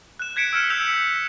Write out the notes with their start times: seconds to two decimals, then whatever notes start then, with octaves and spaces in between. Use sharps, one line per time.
0.19 F#6 E7
0.36 F#6 G#6 B6 C#7 D7 E7
0.53 E6 F6 E7
0.70 E6 G6 B6 C#7 F7